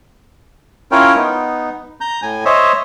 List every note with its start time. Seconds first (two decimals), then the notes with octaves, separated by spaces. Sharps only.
0.92 C#4 E4 F4 A#4 C#5 G5
1.16 B3 D#4
2.01 A#5 G6
2.22 A2 G#5
2.45 C5 C#5 D#5 E5